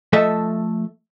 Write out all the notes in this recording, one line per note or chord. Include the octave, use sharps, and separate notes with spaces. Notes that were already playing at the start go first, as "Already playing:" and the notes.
F3 A3 A4 D#5 E5